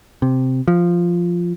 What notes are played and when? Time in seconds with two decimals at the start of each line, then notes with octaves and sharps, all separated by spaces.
0.22 C3
0.68 F3